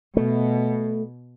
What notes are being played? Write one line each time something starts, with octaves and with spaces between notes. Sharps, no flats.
B2 A3